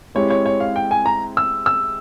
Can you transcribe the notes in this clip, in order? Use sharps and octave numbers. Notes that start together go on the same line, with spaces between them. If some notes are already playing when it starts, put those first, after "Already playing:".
G#3 C4 E4 G4 C#5
C#5
C#5
F5
G5
G#5
A#5
E6
E6